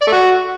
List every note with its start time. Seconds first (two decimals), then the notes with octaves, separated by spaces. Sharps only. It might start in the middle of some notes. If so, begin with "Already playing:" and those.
0.02 D5
0.07 A3
0.12 F#4